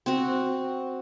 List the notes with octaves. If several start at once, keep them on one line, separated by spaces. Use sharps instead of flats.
C4 F#4